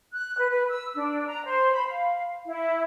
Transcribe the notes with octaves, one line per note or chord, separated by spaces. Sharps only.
F#6
B4
B4
E6
D4
A#5
C5
B5
F5
E4